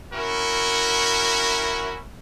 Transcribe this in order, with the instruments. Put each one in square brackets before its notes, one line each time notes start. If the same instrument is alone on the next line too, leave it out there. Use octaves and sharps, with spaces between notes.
[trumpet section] C#4 E4 F#4 A#4